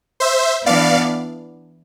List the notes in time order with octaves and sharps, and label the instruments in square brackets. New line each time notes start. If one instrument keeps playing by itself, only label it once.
[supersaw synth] C5 E5
[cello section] E3 B3 D4 [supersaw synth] D5 F5